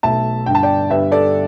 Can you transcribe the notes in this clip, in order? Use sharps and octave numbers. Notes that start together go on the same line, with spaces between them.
B1 B2 A3 E5 A5
G1 G2 D3 G5
A5
D5 G5
G1 G2 G3 B4 E5
A4 D5